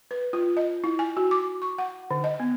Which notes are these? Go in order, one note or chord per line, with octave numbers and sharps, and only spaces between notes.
B4
F4
D#5
E4
G#5
F#4
D6
C#6
F#5
D3
D#5
B3